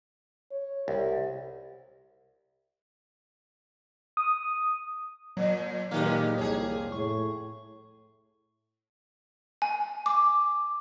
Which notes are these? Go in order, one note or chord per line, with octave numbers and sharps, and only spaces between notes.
C#5
C2 G4
D#6
A#2 F#3
A#2 D#3 G#3 A#3 B3 D#4 G4
C2 F2 G#4 C#5
A2 C#6
G#5
D6